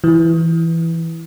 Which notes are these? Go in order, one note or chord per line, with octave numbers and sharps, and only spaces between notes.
E3